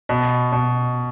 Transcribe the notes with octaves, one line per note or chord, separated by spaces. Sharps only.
B2
B2